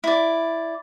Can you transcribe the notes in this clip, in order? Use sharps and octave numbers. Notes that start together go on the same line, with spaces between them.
E4 D5